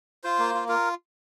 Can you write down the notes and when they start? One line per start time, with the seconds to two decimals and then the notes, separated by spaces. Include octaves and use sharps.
0.24 F4 C5
0.39 A#3
0.54 F4
0.69 F4 A#4